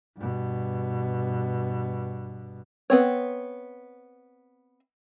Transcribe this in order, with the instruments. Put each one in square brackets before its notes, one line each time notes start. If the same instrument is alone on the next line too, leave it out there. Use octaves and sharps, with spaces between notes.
[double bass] G2 B2
[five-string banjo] B3 C4 C#5